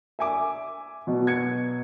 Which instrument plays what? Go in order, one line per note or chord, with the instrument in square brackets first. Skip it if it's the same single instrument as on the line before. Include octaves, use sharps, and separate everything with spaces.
[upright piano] E5 G#5 D6
[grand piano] B2 F#3
[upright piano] G#6 C#7